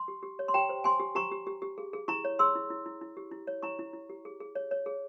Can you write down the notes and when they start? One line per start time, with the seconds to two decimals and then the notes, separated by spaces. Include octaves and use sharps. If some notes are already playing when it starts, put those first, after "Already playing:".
Already playing: C6
0.08 G4
0.23 G4
0.39 C#5
0.48 C6
0.54 G4 G5 A#5
0.69 C5
0.84 G4 G#5 C6
1.00 G4
1.15 G4 A#5 C#6
1.31 G4
1.47 G4
1.62 G4
1.78 G#4
1.93 G#4
2.08 E4 A#5 C#6
2.24 C#5
2.39 G#4 C6 E6
2.55 E4
2.70 E4
2.86 E4
3.01 E4
3.17 G4
3.31 E4
3.47 C#5
3.62 E4 A#5 C#6
3.79 E4
3.93 E4
4.10 G4
4.25 G#4
4.40 G#4
4.55 C#5
4.71 C#5
4.86 G#4